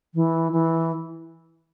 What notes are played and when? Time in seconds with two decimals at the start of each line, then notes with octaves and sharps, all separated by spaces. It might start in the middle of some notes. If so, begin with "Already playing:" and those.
0.15 E3
0.52 E3